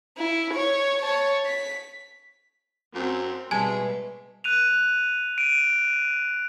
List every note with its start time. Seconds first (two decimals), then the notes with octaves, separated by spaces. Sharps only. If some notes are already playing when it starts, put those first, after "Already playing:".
0.18 E4
0.54 C#5
1.01 C#5 A5
1.46 B6
2.95 F#2 C4
3.51 B2 G3 G#3 B3 E5 G#5 A5 G#6
4.44 F#6 D#7 F7
5.38 D7 D#7